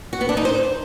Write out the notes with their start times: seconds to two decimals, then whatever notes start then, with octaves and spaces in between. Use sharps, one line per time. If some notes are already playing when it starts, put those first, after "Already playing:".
0.13 F#4
0.21 B3
0.29 D4
0.37 D#4
0.45 C5